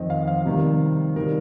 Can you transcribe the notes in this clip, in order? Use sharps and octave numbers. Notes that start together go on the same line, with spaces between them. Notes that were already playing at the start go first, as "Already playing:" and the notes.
Already playing: F2 D#3 C4 D#5
F5
F5
C3 D#3 G3
D#3 G3 D#4 A#4